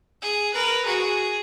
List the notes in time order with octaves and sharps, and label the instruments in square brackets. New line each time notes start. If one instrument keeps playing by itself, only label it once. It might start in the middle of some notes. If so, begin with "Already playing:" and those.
[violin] G#4
[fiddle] A#4 [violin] B4
[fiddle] F#4 [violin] G#4